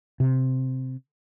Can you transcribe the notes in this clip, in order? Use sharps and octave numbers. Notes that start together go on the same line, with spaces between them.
C3